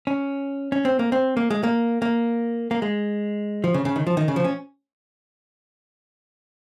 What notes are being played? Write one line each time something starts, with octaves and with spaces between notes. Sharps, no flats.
C#4
C#4
C4
A#3
C4
A#3
G#3
A#3
A#3
A#3
G#3
F3
C#3
C#3
D#3
F3
D#3
C#3
F3
C#4